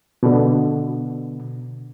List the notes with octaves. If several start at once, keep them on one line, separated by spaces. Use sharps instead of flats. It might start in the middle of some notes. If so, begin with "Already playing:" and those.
B2 D3